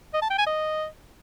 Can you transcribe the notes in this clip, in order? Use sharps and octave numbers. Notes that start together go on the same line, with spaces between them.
D#5
A5
G5
G#5
D#5